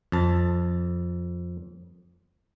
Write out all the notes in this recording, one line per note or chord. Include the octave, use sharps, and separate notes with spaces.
F2 A5